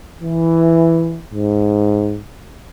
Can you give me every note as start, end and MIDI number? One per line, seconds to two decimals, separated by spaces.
0.22 1.19 52
1.33 2.18 44